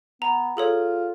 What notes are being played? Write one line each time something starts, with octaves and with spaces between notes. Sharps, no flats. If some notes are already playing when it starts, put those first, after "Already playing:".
B3 A#5
F4 G#4 A4 C#5